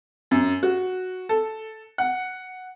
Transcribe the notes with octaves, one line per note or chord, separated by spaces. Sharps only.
F#2
F#4
A4
F#5